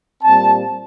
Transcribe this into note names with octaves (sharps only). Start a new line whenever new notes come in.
A#2 G3 C4 A5